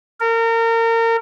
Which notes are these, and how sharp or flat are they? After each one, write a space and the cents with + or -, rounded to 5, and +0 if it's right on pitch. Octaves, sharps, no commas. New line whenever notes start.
A#4 -30